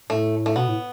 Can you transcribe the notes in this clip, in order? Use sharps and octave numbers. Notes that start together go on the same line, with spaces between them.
A2 A3
A3
B2 B3
A2